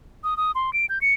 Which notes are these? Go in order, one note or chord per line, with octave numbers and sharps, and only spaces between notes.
D#6
D#6
C6
D7
G6
C#7